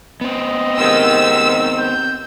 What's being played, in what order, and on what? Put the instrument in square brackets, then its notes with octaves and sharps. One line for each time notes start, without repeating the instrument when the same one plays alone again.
[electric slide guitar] B3 C4 [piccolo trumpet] D#5
[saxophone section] G#2 C3 D#3 [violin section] E6
[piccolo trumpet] G6